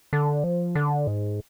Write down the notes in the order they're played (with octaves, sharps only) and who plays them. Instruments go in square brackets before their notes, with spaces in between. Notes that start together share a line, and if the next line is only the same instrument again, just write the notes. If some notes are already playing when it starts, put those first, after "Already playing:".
[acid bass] D3
F3
D3
G#2